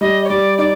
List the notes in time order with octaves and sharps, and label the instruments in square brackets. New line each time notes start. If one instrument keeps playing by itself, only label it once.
[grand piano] G3 [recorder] D#5
[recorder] C#5
[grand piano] G3 [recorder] D5
[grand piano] D#4 [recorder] D5